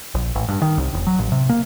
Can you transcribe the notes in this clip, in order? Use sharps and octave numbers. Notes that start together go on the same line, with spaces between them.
A#1
A1
G2
D#3
C2
E1
F#3
A1
C3
A#3